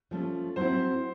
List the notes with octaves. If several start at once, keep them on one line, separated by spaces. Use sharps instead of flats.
F3 A3 C#4
F#3 A3 C4 E4 C5